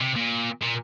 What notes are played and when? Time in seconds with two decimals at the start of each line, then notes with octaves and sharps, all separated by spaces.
0.01 C3
0.16 A#2
0.62 A#2